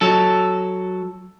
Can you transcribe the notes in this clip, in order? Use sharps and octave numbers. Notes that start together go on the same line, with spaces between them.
F#3 A4